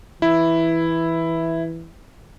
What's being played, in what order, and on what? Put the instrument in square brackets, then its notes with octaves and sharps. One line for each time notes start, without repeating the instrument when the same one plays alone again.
[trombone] E3 [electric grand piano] E4